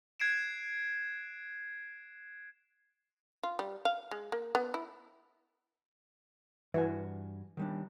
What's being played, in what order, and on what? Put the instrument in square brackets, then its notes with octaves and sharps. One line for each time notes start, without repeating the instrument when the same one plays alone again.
[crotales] F#6 G#6 C7 D7 E7
[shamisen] F4
G3
F5
G#3
A#3
B3
E4
[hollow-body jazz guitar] G2 F#4 G#5 [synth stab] E3
[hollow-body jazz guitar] D#3 G3 D4